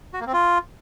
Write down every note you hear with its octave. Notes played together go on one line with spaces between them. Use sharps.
F#4
A#3
C4
F4